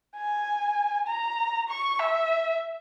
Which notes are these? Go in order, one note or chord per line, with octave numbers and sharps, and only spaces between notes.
G#5
A#5
C#6
E5